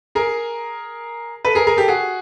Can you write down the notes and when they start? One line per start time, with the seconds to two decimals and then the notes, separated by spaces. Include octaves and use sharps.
0.15 G#4 A#4
1.45 A4 B4
1.55 G#4 A#4
1.67 G#4 A#4
1.77 G4 A4
1.88 F#4 G#4